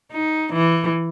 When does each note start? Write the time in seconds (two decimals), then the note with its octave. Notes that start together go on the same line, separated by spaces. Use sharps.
0.11 D#4
0.53 E3